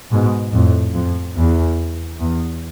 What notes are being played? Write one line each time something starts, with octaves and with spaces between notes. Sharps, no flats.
G#2 B2
F2 A2
F2
E2
E2